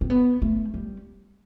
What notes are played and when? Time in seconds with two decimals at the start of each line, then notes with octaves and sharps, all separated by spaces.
0.01 C4
0.10 B3
0.42 A3
0.74 G3